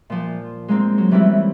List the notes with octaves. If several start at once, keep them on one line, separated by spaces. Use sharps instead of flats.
A#2 F3
G#3 A#3 C4
F#3
E3 G3 C4 C#4 E4